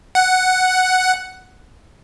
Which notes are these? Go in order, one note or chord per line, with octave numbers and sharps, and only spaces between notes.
F#5